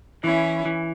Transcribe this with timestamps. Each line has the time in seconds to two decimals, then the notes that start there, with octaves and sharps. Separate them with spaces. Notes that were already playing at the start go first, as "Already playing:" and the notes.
0.23 E3 C#4 E4
0.65 E3